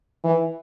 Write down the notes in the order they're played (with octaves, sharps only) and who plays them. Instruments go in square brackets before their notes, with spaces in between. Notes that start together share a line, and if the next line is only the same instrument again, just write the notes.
[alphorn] E3